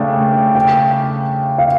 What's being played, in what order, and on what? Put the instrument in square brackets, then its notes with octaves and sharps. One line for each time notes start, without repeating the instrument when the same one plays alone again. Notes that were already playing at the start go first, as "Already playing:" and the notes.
Already playing: [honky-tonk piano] C#3 A3 D4 [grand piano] G5
[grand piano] G5
F5